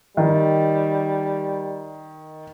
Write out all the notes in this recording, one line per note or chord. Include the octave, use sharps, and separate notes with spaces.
D#3 G3